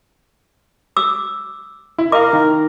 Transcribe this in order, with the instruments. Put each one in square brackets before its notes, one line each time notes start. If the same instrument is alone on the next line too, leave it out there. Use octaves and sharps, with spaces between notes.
[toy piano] D6 E6
[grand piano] E4
[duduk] A#4 [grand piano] D#5 F5 [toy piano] D6
[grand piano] D#3